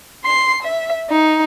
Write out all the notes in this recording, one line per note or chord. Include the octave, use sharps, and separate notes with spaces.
C6 C7
E5
D#4